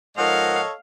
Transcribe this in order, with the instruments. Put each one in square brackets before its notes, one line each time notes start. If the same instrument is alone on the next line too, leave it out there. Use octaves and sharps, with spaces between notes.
[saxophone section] G#2 F3 A#4 [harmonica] A4 C#5 D#5 [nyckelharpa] F5 [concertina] F#5